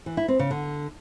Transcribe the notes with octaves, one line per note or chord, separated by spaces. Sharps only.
E3
E4
C4
C#3
D3